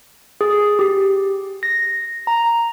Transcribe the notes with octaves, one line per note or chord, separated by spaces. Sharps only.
G#4
G4
A#6
A#5